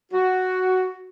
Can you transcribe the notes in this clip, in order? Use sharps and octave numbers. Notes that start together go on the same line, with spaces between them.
F#4